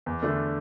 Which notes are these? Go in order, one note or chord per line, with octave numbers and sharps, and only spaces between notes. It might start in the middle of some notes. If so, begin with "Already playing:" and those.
E2
D3 A3 D4